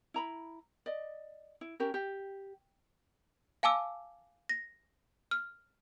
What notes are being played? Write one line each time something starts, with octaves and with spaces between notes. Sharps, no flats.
E4 A#5 B5
D5 D#5
E4
C#4 G4 A#4
G4
F5 G#5 A5 D6 E6
A#6
F6